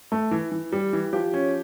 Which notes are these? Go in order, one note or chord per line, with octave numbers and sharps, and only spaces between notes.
A3
E3
E3
G3
E3
F3 G4
C#4